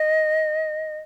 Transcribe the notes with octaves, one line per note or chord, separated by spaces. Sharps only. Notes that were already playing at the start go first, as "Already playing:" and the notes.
Already playing: D#5